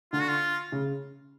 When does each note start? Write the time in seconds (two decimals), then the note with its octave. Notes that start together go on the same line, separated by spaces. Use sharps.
0.13 D3 F4
0.21 F#4
0.28 F4
0.72 C#3